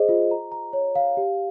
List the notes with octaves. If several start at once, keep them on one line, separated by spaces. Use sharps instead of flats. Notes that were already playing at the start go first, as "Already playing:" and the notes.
Already playing: G#4 C5 D#5
F4
A#5
A#5
C#5
F5
G4